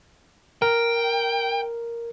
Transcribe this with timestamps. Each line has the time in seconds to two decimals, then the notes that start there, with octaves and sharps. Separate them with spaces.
0.62 A#4 G5